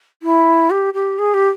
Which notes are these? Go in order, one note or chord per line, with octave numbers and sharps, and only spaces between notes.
E4
G4
G4
G#4
G4